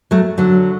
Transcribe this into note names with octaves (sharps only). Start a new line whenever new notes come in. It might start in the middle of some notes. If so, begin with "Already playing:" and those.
F#3 A3
D3 F#3